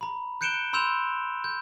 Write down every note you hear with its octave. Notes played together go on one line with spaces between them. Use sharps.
A#5 B5
F#6 G6 C#7 D7 E7 G7
B5 C6 E6 G6 E7 F7
G6